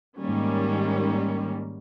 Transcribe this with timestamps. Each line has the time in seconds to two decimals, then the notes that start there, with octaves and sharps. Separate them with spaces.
0.18 G#2 D#3 G3 A#3 C#4